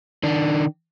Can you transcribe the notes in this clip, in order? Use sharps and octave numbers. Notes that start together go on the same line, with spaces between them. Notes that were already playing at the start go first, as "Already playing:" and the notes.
D#3 D4